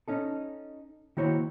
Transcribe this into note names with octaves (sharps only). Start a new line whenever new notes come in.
C#4 D#4 A4
D#3 A#3 E4 F#4 C5 C#5